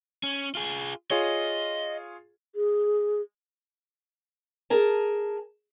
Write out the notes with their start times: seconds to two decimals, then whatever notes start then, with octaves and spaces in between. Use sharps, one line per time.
0.23 C#4
0.55 F4 G#4
1.11 F4 G#4 C#5 D#5
2.55 G#4
4.70 G#4 A#4 A5